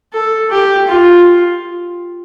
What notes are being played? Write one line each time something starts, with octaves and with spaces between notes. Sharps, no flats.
A4
G4
F4